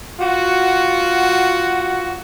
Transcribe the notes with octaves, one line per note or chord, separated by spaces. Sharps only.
F4 F#4